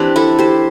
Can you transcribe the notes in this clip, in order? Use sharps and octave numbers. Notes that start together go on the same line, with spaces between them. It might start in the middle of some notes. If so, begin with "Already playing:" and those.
Already playing: E3 C4 D4 G4
E4 A4
G4 C5